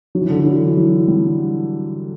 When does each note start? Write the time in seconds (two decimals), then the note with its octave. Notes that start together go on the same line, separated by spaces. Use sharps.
0.15 F#3
0.21 E3
0.30 D3
0.37 E3
0.46 F#3
0.65 E3
0.77 F#3
1.08 G3